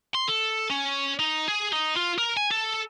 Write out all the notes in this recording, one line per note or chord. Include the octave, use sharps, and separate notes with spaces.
C6
A4
C#4
D#4
G#4
D#4
F4
A#4
G#5
A4